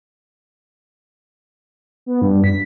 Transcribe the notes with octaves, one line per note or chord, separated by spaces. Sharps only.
B3
G2
B6